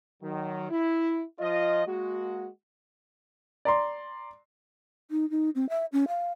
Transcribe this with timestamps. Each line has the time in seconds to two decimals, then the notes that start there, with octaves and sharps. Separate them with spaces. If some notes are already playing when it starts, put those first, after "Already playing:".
0.23 D#3 F#3
0.70 E4
1.40 F3 F4 D#5
1.87 G#3 A#3 F#4
3.65 D5 A#5 C6
5.11 D#4
5.30 D#4
5.55 C4
5.69 E5
5.93 C#4
6.08 F5